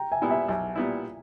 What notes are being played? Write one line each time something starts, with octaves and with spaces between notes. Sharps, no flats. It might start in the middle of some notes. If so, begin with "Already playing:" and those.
Already playing: G5 A#5
E5 G#5
A#2 G3 B3 E4
E5 G#5
B1 E5 G#5
A#2 G3 B3 E4